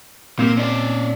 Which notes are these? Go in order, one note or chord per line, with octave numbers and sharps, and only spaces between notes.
A#2 A#3 C4 G4
C#4 D5